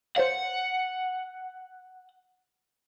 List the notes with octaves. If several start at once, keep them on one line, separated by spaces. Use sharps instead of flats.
C5 C#5 F5 F#5